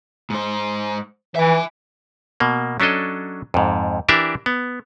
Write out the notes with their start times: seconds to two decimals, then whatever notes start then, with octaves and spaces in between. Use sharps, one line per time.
0.30 G#2 C5
1.36 E3 E5 G#5
2.40 B2 A#3
2.80 F#3 C#4 D4 A4 D#5
3.54 F2 G#2
4.09 E3 D4 G4 A#4 D5 E5
4.46 B3